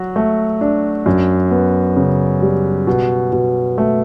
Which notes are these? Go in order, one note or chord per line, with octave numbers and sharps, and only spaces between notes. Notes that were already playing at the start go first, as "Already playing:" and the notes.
Already playing: F#3 F#4
A3
D4
F#2
B3
C#3
G3
B2
B2
A3